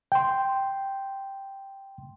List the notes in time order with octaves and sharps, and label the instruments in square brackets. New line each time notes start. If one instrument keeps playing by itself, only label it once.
[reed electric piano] G5 C6